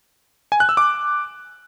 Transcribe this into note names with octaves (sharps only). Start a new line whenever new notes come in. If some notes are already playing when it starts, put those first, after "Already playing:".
G#5
F#6
E6
D6